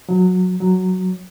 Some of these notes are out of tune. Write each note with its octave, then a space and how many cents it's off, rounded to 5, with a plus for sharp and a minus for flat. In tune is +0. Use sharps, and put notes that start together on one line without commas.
F#3 -15
F#3 +0